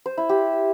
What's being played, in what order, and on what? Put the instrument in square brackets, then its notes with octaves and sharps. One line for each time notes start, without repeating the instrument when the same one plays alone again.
[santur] C5
E4
G4